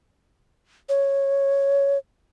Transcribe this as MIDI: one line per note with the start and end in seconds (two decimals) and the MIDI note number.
0.89 1.98 73